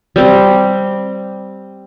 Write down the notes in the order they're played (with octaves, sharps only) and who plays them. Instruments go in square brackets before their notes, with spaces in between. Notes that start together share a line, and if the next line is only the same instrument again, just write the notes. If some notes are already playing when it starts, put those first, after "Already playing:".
[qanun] G3 C4